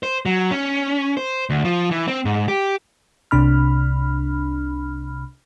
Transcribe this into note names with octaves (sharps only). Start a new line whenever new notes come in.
C5
F#3
C#4
C5
D2
F3
E3
C4
G#2
G4
C2 C3 D4 B5 F6